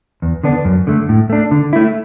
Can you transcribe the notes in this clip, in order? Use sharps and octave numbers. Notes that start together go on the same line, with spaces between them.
E2
D3 B3 D4
F#2
D3 A3
A2
A3 D4
D3
A3 E4